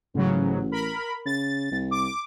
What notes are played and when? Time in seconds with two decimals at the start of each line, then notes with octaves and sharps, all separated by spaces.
0.14 A1 G#2 C#3 F#3
0.72 A#4 B5
1.26 C#3 A6
1.72 C2
1.91 D6